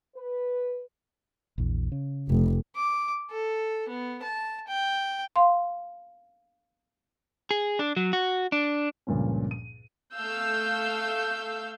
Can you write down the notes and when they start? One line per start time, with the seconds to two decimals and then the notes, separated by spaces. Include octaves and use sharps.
0.16 B4
1.58 A#1 E2
1.92 C#3
2.29 F1
2.76 D6
3.30 A4
3.88 B3
4.23 A5
4.67 G5
5.36 F5 C6
7.51 G#4
7.79 D4
7.97 F#3
8.13 F#4
8.52 D4
9.07 C#2 G2 A#2 F3 C#4
9.51 D#7
10.14 A3 F5 E6 G6